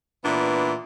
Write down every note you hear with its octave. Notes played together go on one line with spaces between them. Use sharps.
A#2 E3 B3 D4